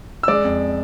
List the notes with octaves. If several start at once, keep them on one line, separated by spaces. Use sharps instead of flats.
E6
G#3 D5 D6
F2